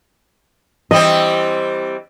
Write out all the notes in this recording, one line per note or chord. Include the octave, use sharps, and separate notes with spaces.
E3 G3 C4 D#5